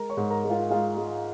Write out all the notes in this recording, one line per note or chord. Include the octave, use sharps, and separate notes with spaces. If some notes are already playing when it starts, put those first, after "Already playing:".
Already playing: G#3 A#4 A#5
C#5 C#6
G#2
A#4 A#5
G#3
F4 F5
G#3 F4 F5
G#3